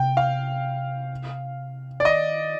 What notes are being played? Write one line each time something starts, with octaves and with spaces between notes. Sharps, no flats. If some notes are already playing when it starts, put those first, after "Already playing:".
Already playing: C3 G5
F5
D5
D#3 D#5